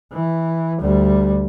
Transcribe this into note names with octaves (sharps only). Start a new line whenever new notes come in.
E3
D2 G3